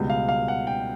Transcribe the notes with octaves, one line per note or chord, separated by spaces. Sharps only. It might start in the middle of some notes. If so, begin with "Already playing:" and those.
Already playing: C#2 B2 G3
F5
F5
F#5
G5